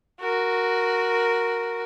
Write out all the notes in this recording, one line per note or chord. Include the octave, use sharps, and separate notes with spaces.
F#4 A#4